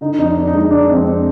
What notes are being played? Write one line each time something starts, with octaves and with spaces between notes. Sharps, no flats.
D3 D#4
F2 D#4
D4
C4 D4
D#4
G#3
D3 D4
F2 C4
C4